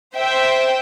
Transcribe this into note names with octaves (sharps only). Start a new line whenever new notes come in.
C5 E5 G5